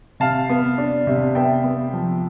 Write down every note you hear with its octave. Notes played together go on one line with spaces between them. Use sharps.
C3 F5 A5
B3
D4
C3
B3 E5 G5
B3
F3